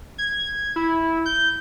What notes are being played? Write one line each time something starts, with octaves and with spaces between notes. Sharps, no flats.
G#6
E4
G6